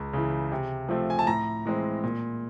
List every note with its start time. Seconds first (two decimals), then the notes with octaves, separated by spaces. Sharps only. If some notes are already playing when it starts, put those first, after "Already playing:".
Already playing: C#2
0.13 C#3 E3
0.52 C3
0.89 F3 A3 C4
1.10 G#5
1.19 A5
1.27 A2 A#5
1.65 E3 G#3 C4
2.03 A#2